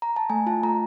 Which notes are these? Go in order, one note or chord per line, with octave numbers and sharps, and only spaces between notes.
A#5
A5
A3 G#5
F4 A5
A3 A#5